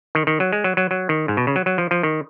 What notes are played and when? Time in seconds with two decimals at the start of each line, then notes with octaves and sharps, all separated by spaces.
0.15 D#3
0.27 D#3
0.40 F#3
0.53 G#3
0.64 F#3
0.77 F#3
0.91 F#3
1.09 D#3
1.28 G#2
1.37 B2
1.47 C#3
1.56 F#3
1.66 F#3
1.78 F3
1.91 F3
2.03 D#3